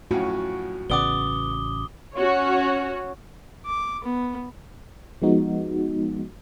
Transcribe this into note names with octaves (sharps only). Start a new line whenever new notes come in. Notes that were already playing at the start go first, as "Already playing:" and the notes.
F2 A2 C#4 F#4
A1 C#3 B3 D5 F#5 D6 D#6 G7
C#4 F#4 C#5
D6
B3
F3 G#3 B3 D#4 F#4